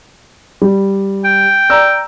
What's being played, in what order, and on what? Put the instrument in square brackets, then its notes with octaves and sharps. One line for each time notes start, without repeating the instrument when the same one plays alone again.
[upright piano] G3
[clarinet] G5
[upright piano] D5 A#5 E6